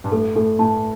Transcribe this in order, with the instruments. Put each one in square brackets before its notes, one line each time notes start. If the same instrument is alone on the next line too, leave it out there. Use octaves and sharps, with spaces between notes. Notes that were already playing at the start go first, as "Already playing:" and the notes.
[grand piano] G2
[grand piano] A2 [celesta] A4
[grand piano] A2 [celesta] A4
[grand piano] A2 [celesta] A5